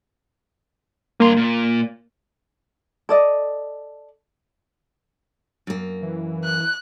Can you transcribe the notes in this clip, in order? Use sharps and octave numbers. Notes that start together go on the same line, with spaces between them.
G2 A#3 A#5 C6
A#2
A4 D5 D#5
F#2 A#3
E3
F#6